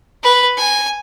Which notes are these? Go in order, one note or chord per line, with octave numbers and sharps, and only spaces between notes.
B4
G#5